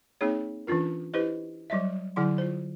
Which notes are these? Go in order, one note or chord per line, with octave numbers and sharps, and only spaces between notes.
A#3 C4 D#4 G#4 C#5
E3 C#4 D4 F4 A#4
E4 G4 B4 C5 D#5
F#3 G3 D#5 E5
D3 F#3 E4 F#5 C6
F4 C5